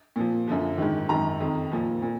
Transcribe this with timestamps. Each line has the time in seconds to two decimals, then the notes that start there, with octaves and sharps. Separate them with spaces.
0.16 A#2 F3
0.48 F#2 D3 F3
0.78 G#2 D#3
1.09 F#2 D#3 A#5
1.40 F2 D#3
1.71 A#2 F3
2.02 A#2